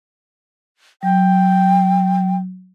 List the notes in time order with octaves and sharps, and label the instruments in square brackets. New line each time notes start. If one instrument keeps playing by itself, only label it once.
[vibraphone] F#3 [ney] G5